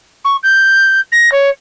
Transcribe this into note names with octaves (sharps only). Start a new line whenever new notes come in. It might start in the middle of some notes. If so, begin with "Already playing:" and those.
C#6
G6
A#6
C#5